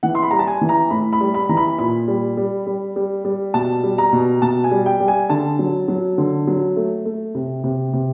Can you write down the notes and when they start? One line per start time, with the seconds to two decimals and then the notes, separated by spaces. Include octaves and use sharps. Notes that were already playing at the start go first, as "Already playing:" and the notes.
0.03 E3 F#5
0.15 C6
0.23 B5
0.31 G3 A#5
0.39 A5
0.47 G#5
0.61 E3
0.69 A#5
0.90 A2 B5
1.13 B5
1.21 G3
1.34 B5
1.49 E3 A#5
1.57 B5
1.79 A#2 B5
2.08 G3
2.37 G3
2.67 G3
2.96 G3
3.25 G3
3.54 B2 A5
3.83 G3
3.98 A#5
4.13 B2
4.42 B2 A5
4.64 G#5
4.71 G3
4.86 G5
5.00 G3
5.08 G#5
5.30 D3 A5
5.59 F#3
5.88 F#3
6.18 D3
6.47 F#3
6.76 A3
7.05 A3
7.35 C3
7.64 C3
7.93 C3